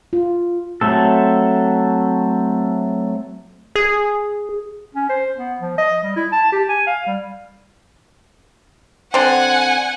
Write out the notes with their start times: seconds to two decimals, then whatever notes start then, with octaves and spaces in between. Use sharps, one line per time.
0.13 F4
0.81 F#3 A3 C4 A4
3.76 G#4
4.95 C#4
5.10 C5
5.37 B3
5.61 F3
5.78 D#5
6.03 G3
6.16 E4
6.32 A5
6.52 G4
6.69 G#5
6.87 F5
7.07 G3
9.14 D3 C4 F#5 G#5